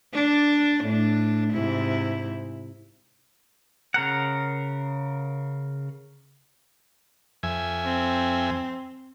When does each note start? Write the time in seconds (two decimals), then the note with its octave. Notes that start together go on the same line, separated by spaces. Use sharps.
0.14 D4 D5
0.84 A2 D4
1.52 G#2 C3 E4
3.94 C#3 A#4 F#5
7.43 F2 E5 G#5
7.85 C4